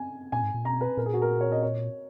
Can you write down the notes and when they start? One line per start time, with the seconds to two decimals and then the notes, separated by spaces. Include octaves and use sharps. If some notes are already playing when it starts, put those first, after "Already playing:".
Already playing: G#5
0.32 A#2 G#5
0.43 G#2
0.54 A#2
0.65 B2 A#5
0.81 B4
0.97 A#2 A#4
1.06 G#4
1.14 F#4
1.22 A#4
1.41 C#5
1.52 D#5
1.62 C#5